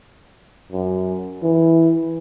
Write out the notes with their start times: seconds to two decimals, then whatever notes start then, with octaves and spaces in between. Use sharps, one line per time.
0.72 F#2
1.43 E3